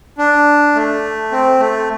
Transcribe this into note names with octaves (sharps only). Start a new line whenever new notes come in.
D4
A3
C4
A3